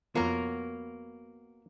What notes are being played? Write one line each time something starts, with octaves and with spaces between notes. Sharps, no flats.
F2 F3 A#3 B3 F#4 A#4 C#5